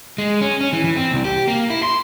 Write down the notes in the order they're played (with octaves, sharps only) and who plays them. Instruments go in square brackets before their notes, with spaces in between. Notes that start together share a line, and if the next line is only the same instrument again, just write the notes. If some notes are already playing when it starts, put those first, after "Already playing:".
[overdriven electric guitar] G#3
C#4
C#4
E3
E3
C4
C2
G4
A#3
E4
C6